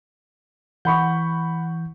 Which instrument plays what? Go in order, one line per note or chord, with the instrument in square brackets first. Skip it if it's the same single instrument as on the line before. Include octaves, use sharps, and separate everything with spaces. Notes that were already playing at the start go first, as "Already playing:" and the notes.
[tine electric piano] E3 G6 [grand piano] F#5 B5 C#6